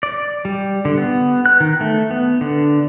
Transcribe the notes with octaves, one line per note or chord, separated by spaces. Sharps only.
D5
G3
D3
B3
F#6
D#3
A3
B3
D3